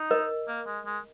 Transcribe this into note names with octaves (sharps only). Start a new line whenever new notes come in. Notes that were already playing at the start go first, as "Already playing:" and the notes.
Already playing: D#4
A#4 D#5
A#3
G#3
G#3